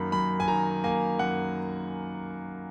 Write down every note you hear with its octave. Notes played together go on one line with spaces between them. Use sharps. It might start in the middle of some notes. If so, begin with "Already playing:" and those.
Already playing: F#2 D#3 A#3 B5
F#2 B5
G#5
D#3 A#5
A#3 G#5
F#2 F#5